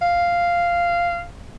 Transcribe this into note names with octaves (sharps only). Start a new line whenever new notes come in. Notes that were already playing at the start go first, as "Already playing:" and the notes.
F5